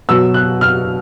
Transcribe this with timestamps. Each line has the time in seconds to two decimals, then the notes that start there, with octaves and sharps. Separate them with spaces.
0.09 B2 F#3 E6
0.34 F#6
0.61 F6